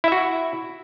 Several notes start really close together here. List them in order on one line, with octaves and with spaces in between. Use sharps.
E4 E5 F#4